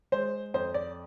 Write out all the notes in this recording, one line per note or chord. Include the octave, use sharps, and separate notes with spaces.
G#3 C5
F2 C5
D5